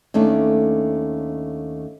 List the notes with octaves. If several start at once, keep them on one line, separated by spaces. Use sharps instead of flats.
D#2 A3 C#4 D4